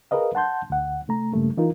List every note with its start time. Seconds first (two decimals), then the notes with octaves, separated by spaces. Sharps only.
0.11 G#4 A#4 B4 D#5 F5
0.35 F#5 A5 C6 G6
0.70 D2 F#5
1.08 C3 A3 A#5
1.32 G2 C#3 G3 A3 A#3
1.57 E3 D#4 F4 A#4